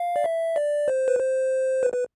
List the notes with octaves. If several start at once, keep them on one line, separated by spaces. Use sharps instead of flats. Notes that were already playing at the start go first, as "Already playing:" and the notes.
Already playing: F5
D5
E5
D5
C5
B4
C5
B4
B4